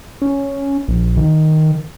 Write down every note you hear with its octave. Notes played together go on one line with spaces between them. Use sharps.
C#4
A#1
D#3